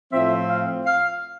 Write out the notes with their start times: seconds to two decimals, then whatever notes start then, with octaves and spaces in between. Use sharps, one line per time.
0.11 A2 F3 C4 E5
0.48 F5
0.86 F5